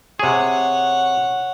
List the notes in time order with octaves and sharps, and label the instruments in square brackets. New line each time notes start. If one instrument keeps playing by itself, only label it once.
[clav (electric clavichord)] C3 G#4 [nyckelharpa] C#5 F#5